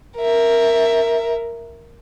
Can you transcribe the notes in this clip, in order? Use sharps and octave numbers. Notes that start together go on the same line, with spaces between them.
A#4 E5